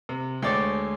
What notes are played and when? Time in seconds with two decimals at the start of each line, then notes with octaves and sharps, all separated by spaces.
0.09 C3
0.42 D2 G#3 A3 C#5 D5 G5